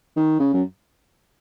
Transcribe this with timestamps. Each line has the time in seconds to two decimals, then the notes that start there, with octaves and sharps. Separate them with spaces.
0.16 D#3
0.40 C#3
0.53 F#2